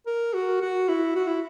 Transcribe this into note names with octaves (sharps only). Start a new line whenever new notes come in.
A#4
F#4
F#4
E4
F#4
E4